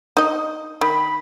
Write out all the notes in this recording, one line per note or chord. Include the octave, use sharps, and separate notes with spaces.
D#4 D#5
D#3 B5